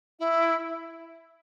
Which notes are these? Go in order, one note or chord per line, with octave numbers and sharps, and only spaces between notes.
E4